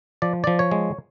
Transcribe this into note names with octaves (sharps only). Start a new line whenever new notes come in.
F3 D5
F3 D5
C#5
G#3